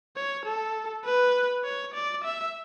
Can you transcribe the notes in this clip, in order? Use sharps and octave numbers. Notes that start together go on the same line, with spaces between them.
C#5
A4
B4
C#5
D5
E5